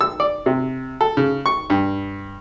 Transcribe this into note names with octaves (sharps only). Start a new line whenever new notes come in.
E6
D5
C3
A4
C#3
C#6
G2